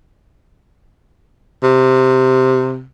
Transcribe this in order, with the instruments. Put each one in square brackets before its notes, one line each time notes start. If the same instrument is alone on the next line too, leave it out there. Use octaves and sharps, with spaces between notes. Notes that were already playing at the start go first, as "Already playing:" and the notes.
[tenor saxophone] C3